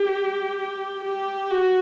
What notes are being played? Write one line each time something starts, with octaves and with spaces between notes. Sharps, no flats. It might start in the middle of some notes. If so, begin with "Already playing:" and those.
Already playing: G4
G4
F#4